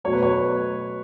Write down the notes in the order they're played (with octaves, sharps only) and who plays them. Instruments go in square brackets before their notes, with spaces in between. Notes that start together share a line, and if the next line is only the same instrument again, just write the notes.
[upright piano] B2 F#3 A3 C#5
B4
C#5